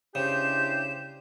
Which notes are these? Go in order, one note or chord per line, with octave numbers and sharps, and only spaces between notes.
C#3 D4 E4 G4 C5 G6 E7